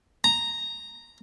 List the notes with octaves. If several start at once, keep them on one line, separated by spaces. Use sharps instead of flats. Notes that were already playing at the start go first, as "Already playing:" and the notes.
A#5